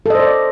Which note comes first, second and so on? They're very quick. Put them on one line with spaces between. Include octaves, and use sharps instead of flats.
A4 D#5 C5 D5